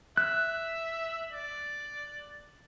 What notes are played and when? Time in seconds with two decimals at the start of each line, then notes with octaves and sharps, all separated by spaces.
0.17 E5 F#6
1.32 D5